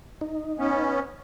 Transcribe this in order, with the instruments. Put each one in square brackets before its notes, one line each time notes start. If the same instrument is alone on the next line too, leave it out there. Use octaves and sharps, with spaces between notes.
[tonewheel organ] D#4
[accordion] B3 C#4